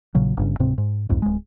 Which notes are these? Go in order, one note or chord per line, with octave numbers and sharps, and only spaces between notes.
A#1 A#2 C#3 F#3
G1 G2 C#3
D1 G#2 C3 C4
G#2
C2 F2 G#2
D1 G#3